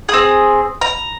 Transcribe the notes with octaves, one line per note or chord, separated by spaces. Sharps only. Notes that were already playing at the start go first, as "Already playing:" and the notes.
C4 G#4 D#6
A#5